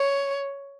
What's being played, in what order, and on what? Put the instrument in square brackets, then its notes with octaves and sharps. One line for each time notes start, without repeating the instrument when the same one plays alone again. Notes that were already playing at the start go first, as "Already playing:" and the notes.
Already playing: [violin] C#5